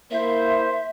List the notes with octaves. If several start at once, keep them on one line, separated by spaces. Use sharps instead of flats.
A#3 E4 C5 E5